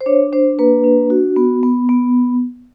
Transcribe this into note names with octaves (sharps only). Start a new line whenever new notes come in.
C5
D4 C#5
D4 C5
A#3 B4
D4
F#4
B3
B3
B3